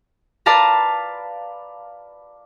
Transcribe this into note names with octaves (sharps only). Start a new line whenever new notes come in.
B4 D5 F5 A5 A#5